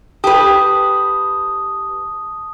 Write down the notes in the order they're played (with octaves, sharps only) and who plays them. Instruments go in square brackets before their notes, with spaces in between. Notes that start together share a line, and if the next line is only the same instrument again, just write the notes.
[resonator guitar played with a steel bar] G4 B4 [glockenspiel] A5 D#6